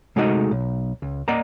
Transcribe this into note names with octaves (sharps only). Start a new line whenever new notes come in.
C3 G#3 A3 D#4 F#4 D#5
B1
C#2
A#3 D5 D#5 F#5 A#5